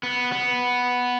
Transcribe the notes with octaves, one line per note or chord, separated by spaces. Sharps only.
B3
B3